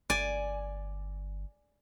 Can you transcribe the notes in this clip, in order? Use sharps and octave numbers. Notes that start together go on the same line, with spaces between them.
G1 D5 G#5